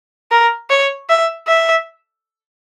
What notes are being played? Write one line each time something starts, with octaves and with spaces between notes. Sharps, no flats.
A#4
C#5
E5
E5